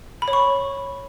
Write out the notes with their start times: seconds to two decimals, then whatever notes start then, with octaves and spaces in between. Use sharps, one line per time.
0.22 B5
0.28 C#5
0.33 C#6